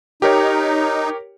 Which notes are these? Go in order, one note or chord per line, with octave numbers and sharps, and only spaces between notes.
D#4 G4 A#4 C#5